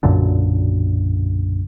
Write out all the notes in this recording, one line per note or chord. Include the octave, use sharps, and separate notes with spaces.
B1 F#2 A#2 D3